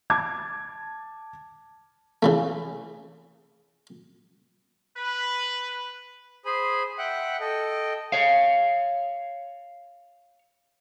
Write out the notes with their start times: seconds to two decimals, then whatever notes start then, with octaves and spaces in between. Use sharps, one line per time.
0.10 A5 D6 G#6
2.23 C#3 E3 A3
4.97 B4
6.45 G#4 C5 G#5 B5
6.98 E5 F#5 G5 F#6
7.40 A4 D#5 G5
8.12 C#5 F5